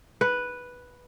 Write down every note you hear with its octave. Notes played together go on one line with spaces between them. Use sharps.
B4